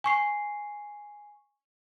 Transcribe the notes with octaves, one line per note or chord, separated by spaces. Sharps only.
G#5 C#6 C7